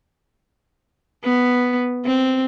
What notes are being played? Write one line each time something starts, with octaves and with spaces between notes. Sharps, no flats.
B3
C4